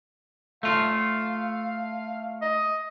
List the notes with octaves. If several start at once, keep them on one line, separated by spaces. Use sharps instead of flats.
A3 F4 F5
D#5